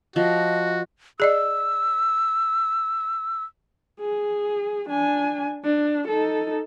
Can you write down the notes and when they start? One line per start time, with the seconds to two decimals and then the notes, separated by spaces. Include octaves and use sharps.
0.16 F3 F#4 D#5
1.20 G#4 D5 D#5 E6
4.00 G#4
4.89 D4 G#5
5.64 D4
6.08 D#4 A4